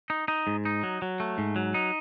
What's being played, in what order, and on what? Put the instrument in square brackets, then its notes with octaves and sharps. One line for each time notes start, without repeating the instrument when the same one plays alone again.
[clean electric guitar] D#4
D#4
G#2
D#4
F#3
F#3
A3
G#2
F#3
D#4